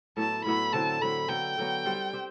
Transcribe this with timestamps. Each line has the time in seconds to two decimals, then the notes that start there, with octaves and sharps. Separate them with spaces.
0.17 A2 F#3 B3 E4 A5
0.45 A2 F#3 B3 E4 B5
0.73 D3 F#3 C4 E4 A5
1.02 D3 F#3 C4 E4 B5
1.29 D3 F#3 B3 G5
1.58 D3 F#3 B3
1.86 G3 C4 G4
2.13 C4 G4